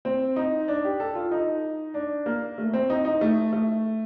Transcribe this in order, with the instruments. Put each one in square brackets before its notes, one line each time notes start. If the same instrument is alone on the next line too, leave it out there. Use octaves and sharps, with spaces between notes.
[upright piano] C4
D#4
D4
G4
A4
F4
D#4
D4
A#3
A3
C4
D#4
D#4
A3
A3